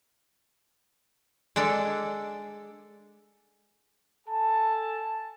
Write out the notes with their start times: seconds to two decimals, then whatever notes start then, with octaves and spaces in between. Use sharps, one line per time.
1.56 G#3 D4 A4 D5
4.27 A4 G#5 A5